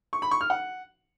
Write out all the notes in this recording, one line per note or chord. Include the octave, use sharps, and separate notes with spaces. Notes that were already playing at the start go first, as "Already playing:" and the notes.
C#6
B5
C#6
F6
F#5